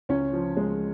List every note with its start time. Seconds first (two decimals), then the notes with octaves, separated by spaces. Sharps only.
0.09 C#2 C#4 C#5
0.33 F3
0.57 G#3